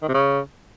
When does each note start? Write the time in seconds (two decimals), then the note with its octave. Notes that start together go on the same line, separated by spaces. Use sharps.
0.02 D#3
0.08 C3
0.14 C#3